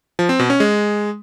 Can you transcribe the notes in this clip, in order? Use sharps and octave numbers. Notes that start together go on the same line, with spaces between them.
F3
C4
B2
C#4
G#3